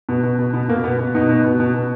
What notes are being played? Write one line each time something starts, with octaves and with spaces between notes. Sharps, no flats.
B2
B2
B2
B2 B3
B2 A#3
B2 B3
B2
B2 D#4
B2
B2
B2
B2